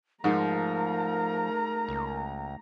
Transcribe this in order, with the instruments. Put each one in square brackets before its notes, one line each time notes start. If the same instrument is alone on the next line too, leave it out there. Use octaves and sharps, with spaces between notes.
[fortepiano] G#2 [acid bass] F3 [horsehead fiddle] A3 A#5 [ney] A#4
[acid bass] C#2